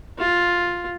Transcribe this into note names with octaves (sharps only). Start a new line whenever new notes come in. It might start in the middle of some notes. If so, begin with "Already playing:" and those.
F4